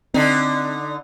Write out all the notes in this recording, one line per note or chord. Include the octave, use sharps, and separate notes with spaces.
D3 C4 D#4